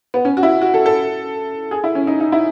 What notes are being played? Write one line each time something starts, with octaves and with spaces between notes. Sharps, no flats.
B3
C#4
F#4
E4
F#4
A4
A4
G#4
E4
C#4
D#4
D#4
E4